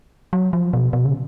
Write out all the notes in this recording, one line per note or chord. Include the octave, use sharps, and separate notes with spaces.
F#3
F3
B2
B2
C#3